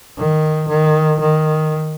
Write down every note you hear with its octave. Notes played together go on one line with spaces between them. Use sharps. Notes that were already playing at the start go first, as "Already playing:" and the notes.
D#3
D#3
D#3